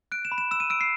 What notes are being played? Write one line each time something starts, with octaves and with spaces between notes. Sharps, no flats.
F#6 D7
E7
B5
E7
E6 E7
D#7
E6 D7
C7